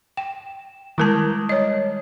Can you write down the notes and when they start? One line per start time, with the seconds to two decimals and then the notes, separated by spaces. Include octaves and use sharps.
0.17 G5 E7
0.98 D#3 G3 G#3 E4 A#4 A5
1.49 C#5 D#5